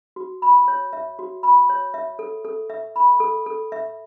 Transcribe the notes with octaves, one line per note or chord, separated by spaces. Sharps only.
F#4
B5
C#5
E5
F#4
B5
C#5
E5
A4
A4
E5
B5
A4
A4
E5